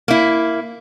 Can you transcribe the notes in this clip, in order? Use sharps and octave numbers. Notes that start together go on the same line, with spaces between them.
A#3 E4